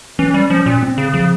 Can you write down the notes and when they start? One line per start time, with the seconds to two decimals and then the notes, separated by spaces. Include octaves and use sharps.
0.19 E3 C#4
0.34 G3
0.50 F3 C#4
0.66 A#2
0.83 C4
0.98 C#3
1.14 C#3 F3